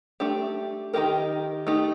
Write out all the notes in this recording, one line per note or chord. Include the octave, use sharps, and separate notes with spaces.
A3 D4 G4
D#3 A3 D#4 G4 A#4
A3 D#4 G4